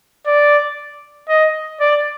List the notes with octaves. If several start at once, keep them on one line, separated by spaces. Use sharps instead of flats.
D5
D#5
D5